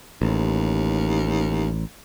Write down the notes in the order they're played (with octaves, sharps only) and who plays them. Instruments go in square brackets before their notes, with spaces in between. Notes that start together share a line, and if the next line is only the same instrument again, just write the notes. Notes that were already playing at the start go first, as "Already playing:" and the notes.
[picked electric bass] A1 [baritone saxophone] D#2